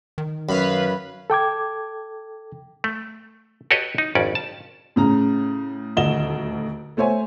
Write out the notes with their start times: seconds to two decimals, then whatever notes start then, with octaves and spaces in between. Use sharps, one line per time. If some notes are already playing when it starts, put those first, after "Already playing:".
0.18 D#3
0.49 F#2 B4 F5 B5
1.30 A4 G5 D6 G#6
2.84 A3
3.71 F#4 G4 A4 B4 C#5 D#5
3.98 D#4
4.15 G#1 F2 C#4 D5
4.35 A5
4.96 A2 C#3 A#5
5.97 D#1 D2 D#5 E7 G7
6.97 A3 C5 C#5 E5 G#5